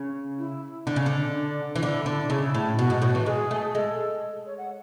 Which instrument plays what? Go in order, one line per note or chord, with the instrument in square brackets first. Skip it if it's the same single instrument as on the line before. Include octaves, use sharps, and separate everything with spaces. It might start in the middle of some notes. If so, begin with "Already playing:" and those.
Already playing: [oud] C#3
[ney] E4
[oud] D3 [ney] D4
[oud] C#3
D3
[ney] D4
[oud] E3
[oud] D3 [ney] E4
[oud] D3
[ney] D4
[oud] C#3 [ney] E4
[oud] A2
[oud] B2 [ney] F#4
[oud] G#2
A2
E3
[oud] G#3 [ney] G#4
[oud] A3
[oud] G#3 [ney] A4
[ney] C#5
F#5